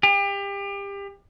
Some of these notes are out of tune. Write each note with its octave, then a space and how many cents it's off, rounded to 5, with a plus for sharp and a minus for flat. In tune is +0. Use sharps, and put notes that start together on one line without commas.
G4 +30